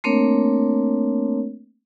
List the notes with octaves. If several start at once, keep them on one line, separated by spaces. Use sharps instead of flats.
A3 A#3 C4 D4 A#4 C#5